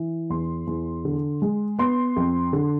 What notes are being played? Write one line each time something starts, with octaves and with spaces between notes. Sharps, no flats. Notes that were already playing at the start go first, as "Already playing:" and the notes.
Already playing: E3
E2 C6
E2
D3
G#3
B3 C6
F2
D3